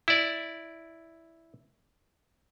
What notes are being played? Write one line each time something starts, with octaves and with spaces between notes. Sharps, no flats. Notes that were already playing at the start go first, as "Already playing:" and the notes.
E4 D5